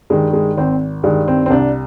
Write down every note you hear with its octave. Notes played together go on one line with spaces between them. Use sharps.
G2 D#3 G#3
G#3
G#1 C4
G2 D#3 G#3
C4
C4
C2 D4